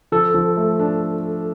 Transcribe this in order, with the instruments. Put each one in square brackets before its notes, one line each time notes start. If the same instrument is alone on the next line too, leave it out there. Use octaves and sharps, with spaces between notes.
[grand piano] F3 [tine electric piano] A4
[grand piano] F3
A3
D4